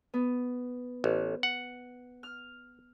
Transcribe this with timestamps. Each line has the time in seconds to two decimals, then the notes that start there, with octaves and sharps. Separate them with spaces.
0.14 B3
1.04 A1
1.43 F#5
2.23 F6